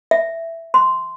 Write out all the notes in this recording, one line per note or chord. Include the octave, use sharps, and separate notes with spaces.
E5
C6